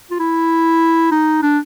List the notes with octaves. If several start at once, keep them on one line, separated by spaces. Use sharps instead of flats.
F4
E4
D#4
D4